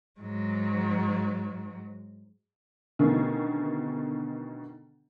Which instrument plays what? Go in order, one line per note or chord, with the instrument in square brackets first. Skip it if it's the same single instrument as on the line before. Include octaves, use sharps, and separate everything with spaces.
[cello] G#2 F#3
[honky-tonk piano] B2 D3 D#3 A3 C#4 G#4